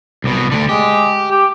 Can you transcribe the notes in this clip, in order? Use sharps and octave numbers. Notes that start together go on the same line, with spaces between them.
C2 B2
D2 D3
G#3 G4
G4